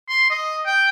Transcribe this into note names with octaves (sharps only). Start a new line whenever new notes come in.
C6
D#5
G5